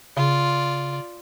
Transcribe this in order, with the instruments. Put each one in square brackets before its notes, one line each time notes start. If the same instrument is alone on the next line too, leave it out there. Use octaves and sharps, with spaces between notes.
[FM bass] C#3 [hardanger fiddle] F4 D5